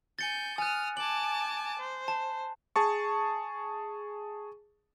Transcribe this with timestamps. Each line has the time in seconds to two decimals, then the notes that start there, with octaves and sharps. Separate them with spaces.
0.19 G#5 G6 A6 C#7
0.58 G#5 D#6 F6 F#6
0.97 G#5 A5 D6 F#7
1.78 C5
2.08 A5
2.76 G#4 A5 C#6